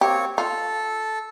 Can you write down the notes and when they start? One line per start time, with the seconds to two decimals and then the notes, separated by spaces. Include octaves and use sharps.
0.01 A#3 C4 G4 C#5
0.38 F4 A4